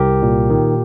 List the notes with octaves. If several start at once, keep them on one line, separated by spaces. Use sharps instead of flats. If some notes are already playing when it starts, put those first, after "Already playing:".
Already playing: C2 G4 A#4
A#2
D#3